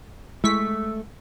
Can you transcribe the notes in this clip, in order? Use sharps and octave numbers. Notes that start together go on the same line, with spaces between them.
G#3 A3 E4 C#6 E6 B6